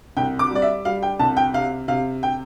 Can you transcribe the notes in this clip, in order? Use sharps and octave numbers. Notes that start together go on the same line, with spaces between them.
C2 G5
D6
G3 D5
E5
G3 F5
G5
C2 A5
G5
C3 F5
C3 F5
G5